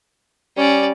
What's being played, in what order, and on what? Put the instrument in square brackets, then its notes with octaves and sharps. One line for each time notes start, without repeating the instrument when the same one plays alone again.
[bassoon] G3 [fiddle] C#4 D5